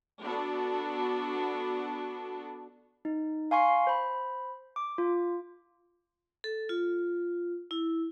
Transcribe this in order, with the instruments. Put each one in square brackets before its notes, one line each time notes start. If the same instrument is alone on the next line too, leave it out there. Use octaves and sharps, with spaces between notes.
[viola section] B3 D4 F#4 A4
[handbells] D#4
F5 G#5 C6 C#6 C7
C5 B5
D6
F4
[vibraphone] A4
F4
E4